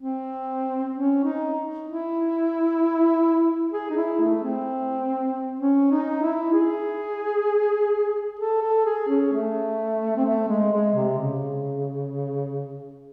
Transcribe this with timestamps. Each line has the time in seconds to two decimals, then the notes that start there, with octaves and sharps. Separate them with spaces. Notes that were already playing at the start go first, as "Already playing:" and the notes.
0.01 C4
0.95 C#4
1.25 D#4
1.87 E4
3.73 G#4
3.90 D#4
3.97 E4
4.20 A3
4.44 C4
5.60 C#4
5.91 D#4
6.22 E4
6.53 G#4
8.40 A4
8.62 A4
8.86 G#4
9.09 C#4
9.33 A3
10.17 C4
10.26 A3
10.49 G#3
10.73 G#3
10.95 C3
11.19 C#3